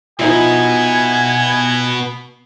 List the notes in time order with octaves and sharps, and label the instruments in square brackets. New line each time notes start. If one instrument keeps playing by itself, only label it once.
[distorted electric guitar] B2 B3 [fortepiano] F3 D#4 E4 [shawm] G#5